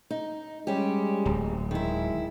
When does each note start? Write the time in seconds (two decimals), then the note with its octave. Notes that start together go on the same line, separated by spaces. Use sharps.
0.10 D#4
0.67 G3 G#3 C#4 G4
1.26 D1
1.71 D#3 G#3 E4